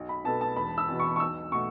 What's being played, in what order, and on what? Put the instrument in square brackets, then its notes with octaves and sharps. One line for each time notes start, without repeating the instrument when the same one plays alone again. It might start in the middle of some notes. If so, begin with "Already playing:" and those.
Already playing: [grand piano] B1
[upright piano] B5
[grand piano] B2 B3 A4 [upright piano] A5
[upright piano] A5
[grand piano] E1 [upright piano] B5
[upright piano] E6
[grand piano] E2 B2
[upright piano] C#6
C#6
[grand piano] B1 [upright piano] E6
[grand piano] B2 A3 F#4 [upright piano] C#6